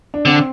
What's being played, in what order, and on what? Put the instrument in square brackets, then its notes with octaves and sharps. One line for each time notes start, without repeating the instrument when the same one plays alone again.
[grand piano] D4
[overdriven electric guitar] D3 [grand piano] C4